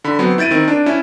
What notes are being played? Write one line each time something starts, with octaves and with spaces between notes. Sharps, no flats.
D3 B5
F#3 B3 C4
E4 G6 A6 D7 D#7
D#3 C4
D4
C#4 E4